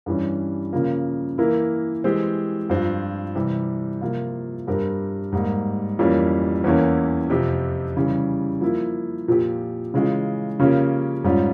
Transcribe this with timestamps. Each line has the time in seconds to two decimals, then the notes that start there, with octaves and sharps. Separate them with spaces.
0.06 G2 E3 G3 C#4
0.73 C#3 F3 A#3
1.38 E3 A#3 E4 A#4
2.04 E3 G#3 C4 G4
2.70 G2 F3 C4 F4
3.35 C3 E3 G3
4.01 C3 F3 A#3 F4
4.67 G2 G3 C4 G4 A#4
5.32 G#2 G3 A#3
5.99 F2 E3 G3 A#3 C#4
6.64 E2 E3 A#3 C#4 E4
7.30 F2 C3 F3 C4 G4
7.97 C#3 E3 G3
8.61 F3 A#3 E4
9.28 A#2 F3 C4 G4
9.94 C#3 E3 G#3 C#4 F4
10.59 C#3 F3 A#3 C#4 G4
11.24 G#2 G3 C#4 F4